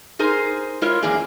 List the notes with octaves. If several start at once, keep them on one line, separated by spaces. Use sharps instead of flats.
D#4 G#4 A#4 C5
G#3 E4 F4 A#4 C#5
F#2 E3 A#3 G#4 D5